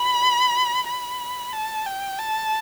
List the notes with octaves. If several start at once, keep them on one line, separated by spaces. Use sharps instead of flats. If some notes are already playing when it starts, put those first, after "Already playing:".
Already playing: B5
B5
A5
G5
A5